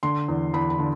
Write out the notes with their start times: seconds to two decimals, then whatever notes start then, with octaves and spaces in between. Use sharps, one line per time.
0.03 D3 C6
0.28 E2
0.54 E2 B5
0.70 B5
0.79 D3